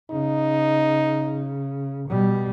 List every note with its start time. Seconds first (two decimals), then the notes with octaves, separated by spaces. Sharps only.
0.11 C#3 D#4
2.09 B2 G3